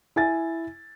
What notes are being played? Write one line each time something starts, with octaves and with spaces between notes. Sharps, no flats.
E4 G#5 A6